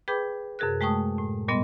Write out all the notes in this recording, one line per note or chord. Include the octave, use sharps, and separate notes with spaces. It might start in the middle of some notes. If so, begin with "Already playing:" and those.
G#4 B4 G5 B5 D6 G6
F#2 C3 G#4 A#4 F#6
G#3 A3 G5 A5 C#6 D#6
A2
A#2 G3 B3 D#5 C6